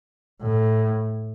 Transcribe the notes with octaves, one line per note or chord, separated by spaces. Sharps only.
A2